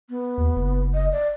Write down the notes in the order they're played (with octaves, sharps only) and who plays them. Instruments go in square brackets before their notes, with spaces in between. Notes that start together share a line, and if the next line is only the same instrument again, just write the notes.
[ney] B3
[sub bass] D#2
F#1
[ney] D#5
D5